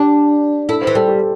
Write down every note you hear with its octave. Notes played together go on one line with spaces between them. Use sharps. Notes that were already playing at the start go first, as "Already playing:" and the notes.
Already playing: D4 G4
E4 A4
C5
E3
G3 A4
G4